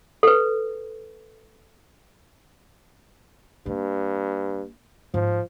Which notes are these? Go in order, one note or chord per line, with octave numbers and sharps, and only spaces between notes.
A4 B4
G2 A#3 D4
G#2 F3